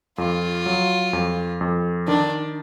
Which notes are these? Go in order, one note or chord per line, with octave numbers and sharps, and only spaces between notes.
F2 F4
F#3
F2
F2
D#3 D4